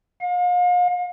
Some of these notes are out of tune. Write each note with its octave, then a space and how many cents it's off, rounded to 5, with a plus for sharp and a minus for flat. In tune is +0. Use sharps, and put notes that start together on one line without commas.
F5 +40